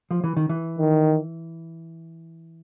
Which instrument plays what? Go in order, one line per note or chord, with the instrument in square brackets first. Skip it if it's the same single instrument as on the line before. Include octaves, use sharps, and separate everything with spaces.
[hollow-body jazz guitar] F3
E3
D#3
E3
[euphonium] D#3